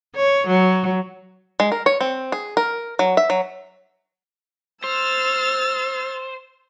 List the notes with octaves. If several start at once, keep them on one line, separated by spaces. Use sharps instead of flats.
C#5
F#3
G#3
A#4
C#5
C4
G#4
A#4
F#3
E5
F#3
C5 E6 F6 A6